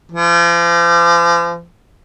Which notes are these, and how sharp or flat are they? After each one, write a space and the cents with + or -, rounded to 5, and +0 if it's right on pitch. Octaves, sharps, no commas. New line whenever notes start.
F3 -40